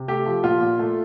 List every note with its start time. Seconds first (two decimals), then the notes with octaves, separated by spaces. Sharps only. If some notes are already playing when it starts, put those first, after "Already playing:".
Already playing: C3
0.08 A3 G4
0.26 F3
0.44 A#2 F4
0.61 A#2
0.79 A3